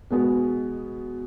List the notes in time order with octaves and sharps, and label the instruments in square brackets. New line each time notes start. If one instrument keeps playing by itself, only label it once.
[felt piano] B2 G#3 B3